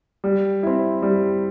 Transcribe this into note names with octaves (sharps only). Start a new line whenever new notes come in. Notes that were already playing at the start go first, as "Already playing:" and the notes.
G3
C4 E4
G3